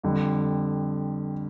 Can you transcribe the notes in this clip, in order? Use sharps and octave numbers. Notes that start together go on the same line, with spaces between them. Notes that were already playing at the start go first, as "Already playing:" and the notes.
F2 D3 G3